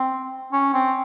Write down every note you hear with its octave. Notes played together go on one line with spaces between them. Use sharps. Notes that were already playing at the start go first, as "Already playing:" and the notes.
Already playing: C4
C#4
C4